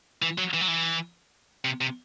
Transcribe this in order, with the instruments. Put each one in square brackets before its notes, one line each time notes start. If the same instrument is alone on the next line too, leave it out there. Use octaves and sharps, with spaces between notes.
[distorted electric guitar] E3
F#3
E3
F#3
E3
C3
C3